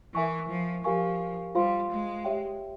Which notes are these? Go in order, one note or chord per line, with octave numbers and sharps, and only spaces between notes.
E3 A#4 E5 G#5 C#6
F3
F3 G4 A#4 F5 G#5 C#6
G3 F4 C5 F5 C6
G#3
G4 C#5 E5 G5